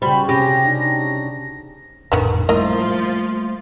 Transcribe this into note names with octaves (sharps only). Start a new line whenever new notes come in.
C#3 G3 F#4 C5 B5
C3 C#4 G4 G#4 A#6
D4 D#4
G#1 F2 A2 D3 D#3 B3
F3 G3 A3 A#3 E4 F4 A#4 D#5